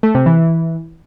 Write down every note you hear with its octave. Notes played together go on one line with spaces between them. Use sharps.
A3
C3
E3